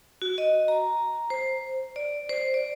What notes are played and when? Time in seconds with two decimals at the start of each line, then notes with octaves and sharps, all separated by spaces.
0.22 F#4
0.38 D#5
0.68 A#5
1.30 C5
1.96 D5
2.29 C5
2.54 D5